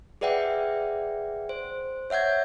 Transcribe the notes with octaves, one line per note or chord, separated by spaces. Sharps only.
G#4 B4 D5 E5 F#5 G5
C5
C#5 E5 F#5 G6 G#6